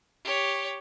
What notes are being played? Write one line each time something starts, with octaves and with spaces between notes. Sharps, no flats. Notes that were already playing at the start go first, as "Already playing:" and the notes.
G4 C#5